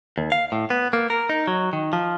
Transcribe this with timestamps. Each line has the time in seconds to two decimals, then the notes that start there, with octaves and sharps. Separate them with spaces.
0.18 D#2
0.32 F5
0.52 A2
0.70 B3
0.93 A#3
1.10 A#4
1.29 D#4
1.48 F#3
1.73 D#3
1.93 F3